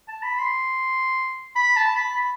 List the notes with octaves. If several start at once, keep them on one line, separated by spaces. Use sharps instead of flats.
A5
B5
C6
B5
A5
B5
B5